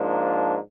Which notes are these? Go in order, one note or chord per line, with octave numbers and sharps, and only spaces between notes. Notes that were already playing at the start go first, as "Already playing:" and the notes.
Already playing: G#2 F3 A#3 D4